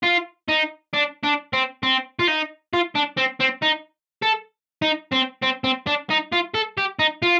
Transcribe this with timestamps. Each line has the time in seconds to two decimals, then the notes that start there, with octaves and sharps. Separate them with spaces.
0.03 F4
0.48 D#4
0.93 D4
1.23 D4
1.53 C4
1.83 C4
2.19 F4
2.27 D#4
2.73 F4
2.95 D4
3.17 C4
3.40 C4
3.62 D#4
4.22 A4
4.82 D#4
5.12 C4
5.42 C4
5.64 C4
5.87 D4
6.10 D#4
6.32 F4
6.54 A4
6.77 G4
6.99 D#4
7.22 F4